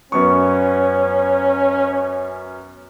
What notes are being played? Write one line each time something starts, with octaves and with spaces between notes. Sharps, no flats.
F#2 B3 C#4 C#6